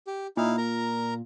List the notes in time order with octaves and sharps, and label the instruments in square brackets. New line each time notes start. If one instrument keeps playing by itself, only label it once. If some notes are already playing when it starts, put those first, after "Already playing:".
[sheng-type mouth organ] G4
[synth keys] A#2 [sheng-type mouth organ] D#4 E4 F5
[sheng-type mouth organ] A#4 A#5